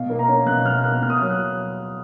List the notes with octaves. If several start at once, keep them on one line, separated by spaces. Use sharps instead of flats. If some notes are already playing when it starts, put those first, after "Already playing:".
Already playing: B2 F5
A#3
A#5
C#4
B2 F#6
B2 F6
A#3 F#6
B2 F6
D#6
F#3 F6
F#6